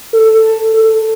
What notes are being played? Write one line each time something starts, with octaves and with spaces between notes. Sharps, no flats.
A4
A4